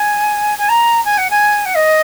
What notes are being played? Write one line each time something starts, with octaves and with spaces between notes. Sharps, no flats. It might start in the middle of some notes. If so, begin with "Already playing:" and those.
Already playing: G#5
G#5
A#5
G#5
F#5
G#5
F#5
D#5